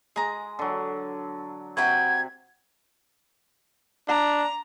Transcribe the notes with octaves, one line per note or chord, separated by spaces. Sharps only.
G#3 G#4 A#5
D3 F#3
C3 F#4 B4 F#5 G5 G#6
D4 A#5